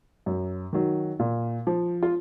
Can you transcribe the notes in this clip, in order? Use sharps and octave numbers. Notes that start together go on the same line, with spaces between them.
F#2
D#3 F#3
A#2
F3
F4